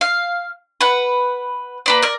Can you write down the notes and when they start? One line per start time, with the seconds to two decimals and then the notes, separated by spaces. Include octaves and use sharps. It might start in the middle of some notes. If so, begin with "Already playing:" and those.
0.01 F5
0.81 B4 F#5
1.86 A#3 B4 D5
2.02 A#4 D5